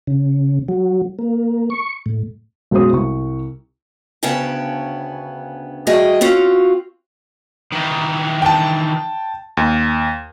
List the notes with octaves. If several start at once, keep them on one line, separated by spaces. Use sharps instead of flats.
C#3
F#3
A#3
C#6
A2
B1 F#2 G#3 F#4 C5 D#6
C2 C#6
D2 C#3 B3 C#4 G5 A5
G3 A3 F#4 G#4 D#5 G5
C4 C#4 F4 F#4
D#3 E3
G5 A5
D#2